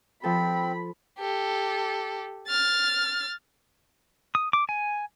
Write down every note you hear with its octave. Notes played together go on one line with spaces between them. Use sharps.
F3 C4 A4 B5
G4 A4
F6 A6
D#6
D6
G#5